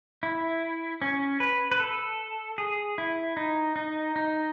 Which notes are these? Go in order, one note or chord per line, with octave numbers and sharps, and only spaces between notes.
E4
C#4
B4
B4
A4
G#4
E4
D#4
D#4
D#4